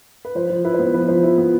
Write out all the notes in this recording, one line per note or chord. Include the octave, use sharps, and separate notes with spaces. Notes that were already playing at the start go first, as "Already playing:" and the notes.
B4
F3 C5
F3
E4 B4
C5
B3
C5
F3 B4
F3 C5
E4
B3